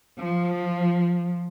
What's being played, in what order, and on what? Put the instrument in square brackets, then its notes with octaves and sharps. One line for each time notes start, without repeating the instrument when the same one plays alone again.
[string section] F3